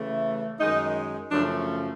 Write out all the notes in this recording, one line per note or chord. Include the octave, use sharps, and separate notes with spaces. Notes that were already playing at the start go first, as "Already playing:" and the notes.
Already playing: C#3 E3 A3
F#2 D#3 G#3 D#4
F#2 C#3 F3 A3 D4